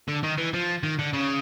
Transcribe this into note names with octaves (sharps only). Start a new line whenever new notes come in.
D3
D#3
E3
F3
D#3
D3
C#3